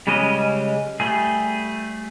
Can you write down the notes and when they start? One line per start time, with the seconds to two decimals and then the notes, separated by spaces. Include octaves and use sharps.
0.07 C#3 G3 G#3 C#4 D#5
1.00 G3 A3 G#4